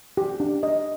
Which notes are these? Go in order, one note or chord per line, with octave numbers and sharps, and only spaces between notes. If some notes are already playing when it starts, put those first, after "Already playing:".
G4
D4
D#5